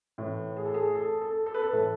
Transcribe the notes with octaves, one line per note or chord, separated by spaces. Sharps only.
A2 E3
G#4
A4
G#4
A4
A4
A4
B4
A4
A2 E3